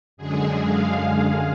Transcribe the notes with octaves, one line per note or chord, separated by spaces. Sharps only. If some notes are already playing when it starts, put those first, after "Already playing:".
F#2 D3 G#3 G#4
F5